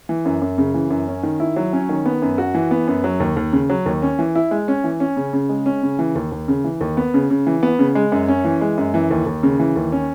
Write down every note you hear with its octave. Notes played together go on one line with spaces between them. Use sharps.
E3
F#2
F#2
C#3
E3
F#2
C#4
D#3
E4
F#3
C#4
D#3
B3
F#2
F#4
E3
B3
F#2
F#3
D#2
D#2
C#3
F#3
D#2
C#4
E3
E4
G#3
C#4
E3
C#4
C#3
C#3
G#3
C#4
C#3
E3
D#2
D#2
C#3
E3
D#2
B3
C#3
C#3
E3
B3
C#3
G#3
F#2
C#4
E3
G#3
F#2
E3
D#2
D#2
C#3
E3
D#2
C#4